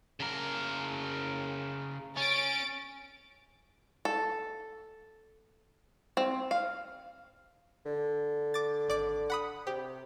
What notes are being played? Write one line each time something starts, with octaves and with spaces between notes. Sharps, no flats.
C#3 A#4
C#4 A6 D7
A4
C4
F5
D3
D6 A6
G#1 D5 D6
F#5 B5 D#6
C3 G4